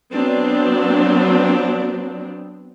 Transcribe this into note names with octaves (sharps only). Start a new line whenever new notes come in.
F#3 B3 C4 D4